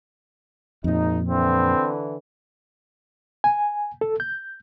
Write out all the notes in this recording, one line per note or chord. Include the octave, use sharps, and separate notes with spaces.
G#1 F2 A#2 D#4
D3 E3 C4
G#5
A4
G6